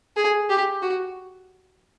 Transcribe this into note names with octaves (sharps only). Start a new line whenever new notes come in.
G#4
G4
F#4